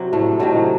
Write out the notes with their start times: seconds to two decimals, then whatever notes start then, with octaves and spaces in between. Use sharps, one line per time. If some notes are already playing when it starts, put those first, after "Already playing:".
Already playing: C3 F#3
0.13 A2 A3
0.39 A2 C3 D#3 F#3 A3